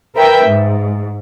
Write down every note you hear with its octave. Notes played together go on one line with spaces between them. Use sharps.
A#4 B4 E5 G5
G#2